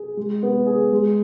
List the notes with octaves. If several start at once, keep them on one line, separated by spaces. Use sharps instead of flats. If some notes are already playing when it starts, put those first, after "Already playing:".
Already playing: G#4
G#3
B3
G#4
G#3